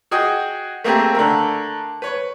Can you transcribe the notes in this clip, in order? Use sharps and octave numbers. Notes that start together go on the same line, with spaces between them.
F#4 G#4 D#5 G5
A3 A#3 C4 G4 G#4 A#4
D3 A3 A#4
B4 C#5